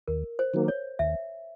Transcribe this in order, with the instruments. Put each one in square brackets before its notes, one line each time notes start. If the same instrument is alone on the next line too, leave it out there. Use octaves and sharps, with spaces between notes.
[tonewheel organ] D#2 [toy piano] A#4
[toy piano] C5
[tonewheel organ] D#3 F#3 A#3
[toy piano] C#5
[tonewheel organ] D#2 [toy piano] E5